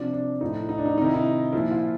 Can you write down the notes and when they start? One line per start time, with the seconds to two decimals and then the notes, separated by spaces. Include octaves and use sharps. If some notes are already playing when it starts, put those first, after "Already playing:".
Already playing: C3 F3 D4
0.13 D4
0.41 A2 F3 D#4
0.69 D#4
0.78 D4
0.86 D#4
0.97 C3 D#4
1.01 D#3 E4
1.14 D#4
1.52 A#2 F3 E4
1.71 F4